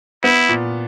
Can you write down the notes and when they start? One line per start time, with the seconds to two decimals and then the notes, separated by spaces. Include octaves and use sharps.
0.24 B3 E4
0.49 A#2